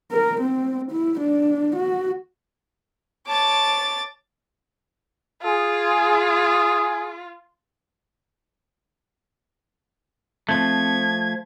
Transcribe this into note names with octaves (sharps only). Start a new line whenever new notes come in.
A#4
C4
E4
D4
F#4
C#5 A5 D6 A6
F4 G#4
F3 A3 C4 G#6